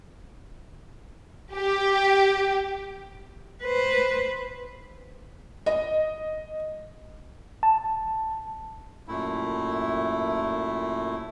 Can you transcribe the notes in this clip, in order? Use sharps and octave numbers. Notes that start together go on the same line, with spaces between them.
G4
B4 C5
D#5
A5
F#2 A#2 A3 E4